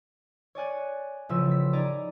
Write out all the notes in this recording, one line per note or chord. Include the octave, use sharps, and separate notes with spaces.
C#5 D5 G#5 F#6
A1 C#3 F3 E6
B6
D#4 G#4 D5 A#5 D6